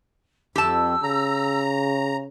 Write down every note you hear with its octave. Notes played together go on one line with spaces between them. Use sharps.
F2 G4 A5 E6
C#3 A#5